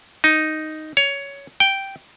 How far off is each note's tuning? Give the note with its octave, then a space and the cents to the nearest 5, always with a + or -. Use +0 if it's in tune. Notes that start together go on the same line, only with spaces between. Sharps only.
D#4 +0
C#5 +15
G5 -5